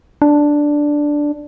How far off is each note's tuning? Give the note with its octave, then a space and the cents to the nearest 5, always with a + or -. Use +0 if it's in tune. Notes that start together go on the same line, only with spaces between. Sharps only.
D4 +0